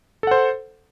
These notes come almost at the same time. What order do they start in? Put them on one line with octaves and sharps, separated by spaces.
A4 F#5 C5